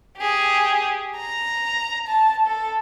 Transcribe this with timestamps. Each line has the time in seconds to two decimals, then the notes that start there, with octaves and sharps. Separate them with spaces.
0.18 G4 G#4
1.17 A#5
2.08 A5
2.47 A4